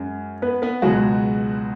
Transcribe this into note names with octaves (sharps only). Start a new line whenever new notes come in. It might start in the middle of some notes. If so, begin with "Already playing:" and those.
Already playing: F#2 G#3 C#4
B3 B4
B3 B4
C#2 B2 F#3 G#3 F#4